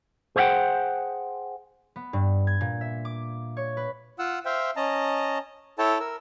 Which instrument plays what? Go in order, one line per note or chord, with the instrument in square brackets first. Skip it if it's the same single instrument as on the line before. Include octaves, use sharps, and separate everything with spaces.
[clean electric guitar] G#4 C5 C#5 E5 F#5 G5
[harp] B3
G2
G#6
A#2
E5
D6
C#5
B4
[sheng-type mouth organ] F4 F#5 E6
C5 E5 F5 G5
C#4 D#5 A5 A#5
E4 A4 C#5 G5 A5
A#4 E6